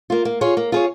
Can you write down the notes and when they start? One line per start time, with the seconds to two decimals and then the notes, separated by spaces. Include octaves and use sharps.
0.10 A#3 F4
0.25 A#3
0.41 F4 G#4 C#5
0.57 A#3
0.72 F4 G#4 C#5